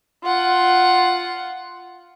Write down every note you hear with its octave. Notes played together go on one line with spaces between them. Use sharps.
F4 F#5